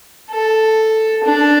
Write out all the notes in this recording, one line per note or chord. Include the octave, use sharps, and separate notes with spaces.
A4
D4